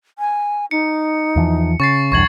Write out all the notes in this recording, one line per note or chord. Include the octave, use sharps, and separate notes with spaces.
G#5
D#4 C#7
E2 E3 F3
C#3 C#6 A6 C7
B1 E2 G2 C#6 G#6 F#7